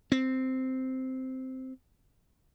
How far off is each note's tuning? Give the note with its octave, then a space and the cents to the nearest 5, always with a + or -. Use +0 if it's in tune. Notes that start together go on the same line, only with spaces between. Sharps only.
C4 -5